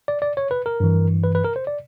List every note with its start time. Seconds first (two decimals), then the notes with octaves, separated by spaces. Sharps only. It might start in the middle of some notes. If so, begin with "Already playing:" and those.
0.08 D5
0.22 D5
0.37 C#5
0.51 B4
0.66 A#4
0.80 G2 E3
1.24 B4
1.35 B4
1.45 A#4
1.56 C5
1.67 D5